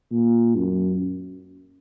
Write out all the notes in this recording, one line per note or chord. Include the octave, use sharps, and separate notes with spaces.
A#2
F#2